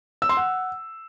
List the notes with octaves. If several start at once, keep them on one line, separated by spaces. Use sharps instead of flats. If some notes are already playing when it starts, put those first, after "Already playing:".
E6
C6
F#5